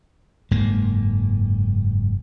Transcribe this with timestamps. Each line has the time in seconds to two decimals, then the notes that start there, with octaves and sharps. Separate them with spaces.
0.51 F#1 G#2 A#3